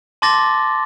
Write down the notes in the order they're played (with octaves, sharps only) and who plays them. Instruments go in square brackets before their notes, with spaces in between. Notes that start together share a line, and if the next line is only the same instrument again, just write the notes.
[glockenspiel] A5 C6 D6 A6 A#6